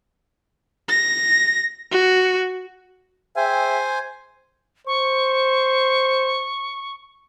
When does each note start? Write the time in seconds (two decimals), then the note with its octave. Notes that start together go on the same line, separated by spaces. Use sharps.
0.89 A#6
1.91 F#4
3.36 G#4 C5 E5 G5 G#5
4.87 C5 C#6